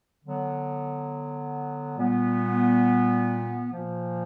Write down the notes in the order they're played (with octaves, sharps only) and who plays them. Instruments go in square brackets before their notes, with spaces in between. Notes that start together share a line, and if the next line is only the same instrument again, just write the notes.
[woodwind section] D3 F#3 B3
A#2 G3 B3
A#2 F3 A#3